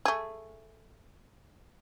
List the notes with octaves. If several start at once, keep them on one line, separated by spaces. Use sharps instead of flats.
A3 G#4